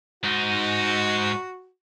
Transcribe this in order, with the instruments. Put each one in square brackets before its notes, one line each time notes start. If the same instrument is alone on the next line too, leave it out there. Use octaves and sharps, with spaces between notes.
[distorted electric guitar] G#2 D#4 [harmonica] F#4